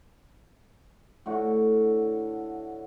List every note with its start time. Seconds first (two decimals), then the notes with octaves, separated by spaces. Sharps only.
1.26 A2 D3 F#4